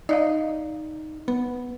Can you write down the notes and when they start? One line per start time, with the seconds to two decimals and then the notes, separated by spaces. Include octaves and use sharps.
0.09 D#4 D5 D#5 F5
1.28 B3